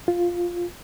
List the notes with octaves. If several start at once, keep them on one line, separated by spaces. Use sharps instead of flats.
F4